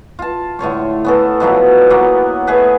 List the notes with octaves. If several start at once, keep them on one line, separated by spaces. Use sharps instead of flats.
F4 A5
A2 D3 C#5 C#6
B3 C#4 A4
B2 F3 F#3 E4
A#3 B3 F#4
A3 G#4 B4